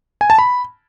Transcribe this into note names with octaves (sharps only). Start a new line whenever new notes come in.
G#5
A5
B5